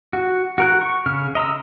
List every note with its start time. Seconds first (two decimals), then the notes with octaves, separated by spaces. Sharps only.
0.13 F#4
0.58 F#4 A#4 F#6
0.81 C#6
1.06 C#3 F6
1.35 D#5 A#5 B5 E6